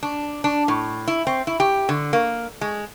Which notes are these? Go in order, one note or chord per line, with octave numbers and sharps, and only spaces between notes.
D4
D4
A2
E4
C4
E4
G4
D3
A#3
G#3